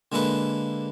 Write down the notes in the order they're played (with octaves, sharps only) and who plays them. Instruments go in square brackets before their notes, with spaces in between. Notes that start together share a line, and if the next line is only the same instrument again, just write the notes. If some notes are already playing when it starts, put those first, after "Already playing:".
[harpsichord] D3 G#3 A#3 A4 B4